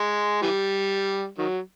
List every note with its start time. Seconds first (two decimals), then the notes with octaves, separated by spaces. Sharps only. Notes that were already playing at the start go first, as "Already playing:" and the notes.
Already playing: G#3
0.42 E3 G3
1.38 D#3 F#3